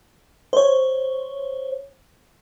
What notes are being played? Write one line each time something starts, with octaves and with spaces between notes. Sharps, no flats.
C5 C#5